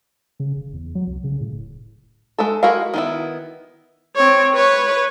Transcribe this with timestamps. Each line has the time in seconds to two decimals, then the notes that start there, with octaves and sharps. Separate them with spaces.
0.40 C#3
0.56 F1
0.73 E2
0.95 F#3
1.07 C2
1.24 C#3
1.41 A2
1.52 D1
1.66 D1
2.38 G#3 A3 A4
2.63 G#3 E4 F#4 A#4 F5
2.94 D#3 B3 E4
4.16 C4 C#5
4.54 B4 C#5